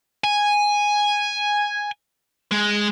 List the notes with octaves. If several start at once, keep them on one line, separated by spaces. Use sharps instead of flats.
G#5
G#3